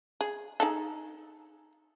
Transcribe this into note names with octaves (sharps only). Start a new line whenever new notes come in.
G#4
D#4 G#4 A4